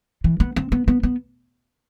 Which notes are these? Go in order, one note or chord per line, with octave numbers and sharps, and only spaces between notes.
E3
B3
C4
B3
B3
B3